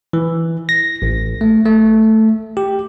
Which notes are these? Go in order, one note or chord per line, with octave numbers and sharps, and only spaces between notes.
E3
A#6
A1
A3
A3
G4